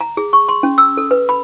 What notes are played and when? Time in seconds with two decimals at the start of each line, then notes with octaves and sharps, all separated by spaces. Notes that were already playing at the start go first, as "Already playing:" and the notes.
0.01 A#5
0.17 G#4
0.33 C#6
0.49 C6
0.63 C#4
0.78 E6
0.97 A4
1.11 B4
1.29 B5